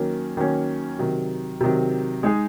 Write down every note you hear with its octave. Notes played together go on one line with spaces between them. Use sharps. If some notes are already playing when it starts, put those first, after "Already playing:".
Already playing: D#3 F#3 A#3 C#4
D#3 F#3 A#3 C#4
C3 D#3 F#3
C3 D#3 F#3
G#3 D#4 G#4